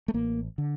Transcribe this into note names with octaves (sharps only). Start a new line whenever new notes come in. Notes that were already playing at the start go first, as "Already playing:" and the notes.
A3
A1 A#3
D3